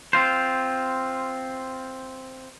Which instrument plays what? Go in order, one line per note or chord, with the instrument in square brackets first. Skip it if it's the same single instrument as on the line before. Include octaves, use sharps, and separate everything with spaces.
[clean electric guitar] C4 F4 C5